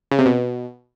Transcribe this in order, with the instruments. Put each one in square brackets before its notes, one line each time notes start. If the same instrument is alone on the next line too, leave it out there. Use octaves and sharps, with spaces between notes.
[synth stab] C#3
C3
B2